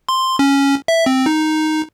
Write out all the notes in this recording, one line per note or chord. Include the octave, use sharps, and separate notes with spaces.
C6
C#4
E5
C4
D#4